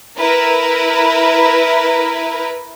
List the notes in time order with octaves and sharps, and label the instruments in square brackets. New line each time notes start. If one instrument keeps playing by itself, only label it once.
[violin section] E4 A#4 B4